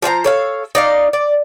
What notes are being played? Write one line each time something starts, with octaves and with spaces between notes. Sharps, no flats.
F3 C5 D5 A#5
A4 C#5 F5
D#4 D5 F5
D5